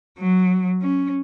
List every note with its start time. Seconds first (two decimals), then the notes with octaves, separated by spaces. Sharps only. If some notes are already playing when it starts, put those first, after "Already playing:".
0.19 F#3
0.82 C#4